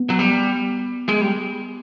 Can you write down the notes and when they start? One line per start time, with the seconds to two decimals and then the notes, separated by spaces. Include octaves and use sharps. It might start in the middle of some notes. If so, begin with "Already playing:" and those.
Already playing: B3
0.10 F#3
0.19 G3
1.09 G#3
1.21 G3